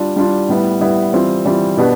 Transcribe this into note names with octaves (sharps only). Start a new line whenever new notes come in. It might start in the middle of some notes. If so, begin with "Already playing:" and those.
Already playing: G3 D4 F4
G3 D4 F4
A2 G3 B3 E4
A2 G3 B3 E4
E3 G3 C4 F4
E3 G3 C4 F4
B2 B3 D4 G4